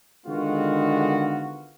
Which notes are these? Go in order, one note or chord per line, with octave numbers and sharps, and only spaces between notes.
D3 D#3 G#3 B3 F4 F#4